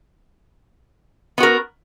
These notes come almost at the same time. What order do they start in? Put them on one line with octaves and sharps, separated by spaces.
B3 F#4 A#4